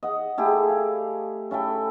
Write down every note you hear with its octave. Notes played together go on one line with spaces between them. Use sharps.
D#5 F#5
A3 E4 G4 G#4
F5
C#4 E4 A4 G5